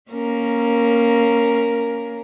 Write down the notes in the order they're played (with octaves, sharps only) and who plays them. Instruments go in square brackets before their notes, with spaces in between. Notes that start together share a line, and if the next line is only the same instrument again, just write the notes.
[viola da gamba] A#3 C#4 A#4